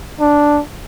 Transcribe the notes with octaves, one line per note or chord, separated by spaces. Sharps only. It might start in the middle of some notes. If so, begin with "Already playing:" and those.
D4